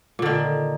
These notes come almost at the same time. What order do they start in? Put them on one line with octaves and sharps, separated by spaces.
A#2 D3 D#3